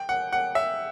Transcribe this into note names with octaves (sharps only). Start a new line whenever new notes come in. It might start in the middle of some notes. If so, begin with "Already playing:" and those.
Already playing: G5
F#5
F#5
E5